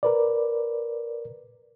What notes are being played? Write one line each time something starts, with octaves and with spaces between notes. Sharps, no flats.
A#4 B4 D5